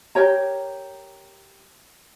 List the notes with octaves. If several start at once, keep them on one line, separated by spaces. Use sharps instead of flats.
G4 A#4 C#5 A#5